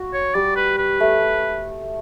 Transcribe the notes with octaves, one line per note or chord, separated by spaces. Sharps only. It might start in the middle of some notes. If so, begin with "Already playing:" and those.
Already playing: F#4
C#5
G3 D5
B4
B4
A3